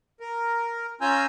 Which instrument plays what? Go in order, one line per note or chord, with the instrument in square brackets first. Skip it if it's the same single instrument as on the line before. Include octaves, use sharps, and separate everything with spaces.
[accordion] A#4
C#4 F4 G#5 A#5 E6 G6